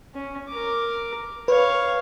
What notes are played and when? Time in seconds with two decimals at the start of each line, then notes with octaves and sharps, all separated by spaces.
0.14 C#4
0.49 A#4 D6
1.48 B4 C#5 F5